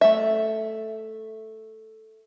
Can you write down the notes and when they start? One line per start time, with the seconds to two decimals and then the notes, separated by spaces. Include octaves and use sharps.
0.01 A3 E5